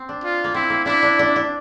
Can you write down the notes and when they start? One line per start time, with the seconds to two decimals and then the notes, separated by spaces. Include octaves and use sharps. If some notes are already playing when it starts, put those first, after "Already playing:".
Already playing: C4
0.09 D4
0.24 F4
0.44 A#3
0.54 C4 E4
0.70 A#3
0.85 D4 E4
1.03 D4
1.19 D4
1.36 D4